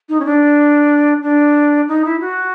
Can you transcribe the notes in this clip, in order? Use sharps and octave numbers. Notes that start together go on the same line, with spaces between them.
D#4
C#4
D4
D4
D#4
E4
F#4